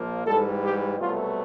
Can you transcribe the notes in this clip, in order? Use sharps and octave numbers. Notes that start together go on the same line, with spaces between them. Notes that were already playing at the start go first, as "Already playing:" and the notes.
Already playing: A#1 A#2 F3 A#3
G#2 E3 G3 A4
G4
C2 B2 F#3 A3 F4